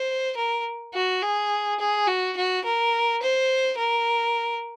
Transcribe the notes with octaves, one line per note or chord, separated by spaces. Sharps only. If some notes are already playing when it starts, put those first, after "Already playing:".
Already playing: C5
A#4
F#4
G#4
G#4
F#4
F#4
A#4
C5
A#4